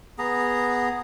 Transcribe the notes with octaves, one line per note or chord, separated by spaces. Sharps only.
B3 G#4 A#5